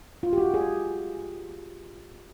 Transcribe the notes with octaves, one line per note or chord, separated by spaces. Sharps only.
F4
G4
F#4
G#4